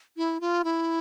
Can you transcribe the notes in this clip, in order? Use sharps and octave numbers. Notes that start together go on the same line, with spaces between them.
E4
F4
E4